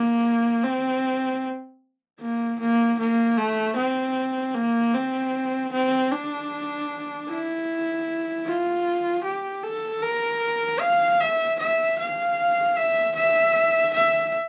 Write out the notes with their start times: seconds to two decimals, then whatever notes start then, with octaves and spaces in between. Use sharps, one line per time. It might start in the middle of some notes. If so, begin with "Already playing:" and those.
Already playing: A#3
0.63 C4
2.20 A#3
2.60 A#3
2.99 A#3
3.37 A3
3.76 C4
4.54 A#3
4.94 C4
5.72 C4
6.11 D4
7.28 E4
8.45 F4
9.24 G4
9.63 A4
10.02 A#4
10.80 F5
11.20 E5
11.59 E5
11.98 F5
12.77 E5
13.16 E5
13.94 E5